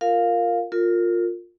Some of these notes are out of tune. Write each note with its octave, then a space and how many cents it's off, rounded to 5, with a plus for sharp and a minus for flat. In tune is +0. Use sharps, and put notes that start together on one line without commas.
F4 +0 A#4 -15 F5 +5
F4 +15 A#4 -25